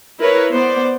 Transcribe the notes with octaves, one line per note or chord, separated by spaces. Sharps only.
E4 A#4 B4 C#5
B3 C5 D5